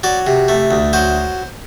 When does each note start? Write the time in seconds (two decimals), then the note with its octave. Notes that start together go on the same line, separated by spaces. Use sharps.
0.03 F#3 D5
0.27 C3
0.48 A3
0.71 D2
0.93 F#3 C5